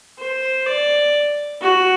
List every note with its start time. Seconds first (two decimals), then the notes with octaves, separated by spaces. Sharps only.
0.19 C5
0.66 D5
1.61 F#4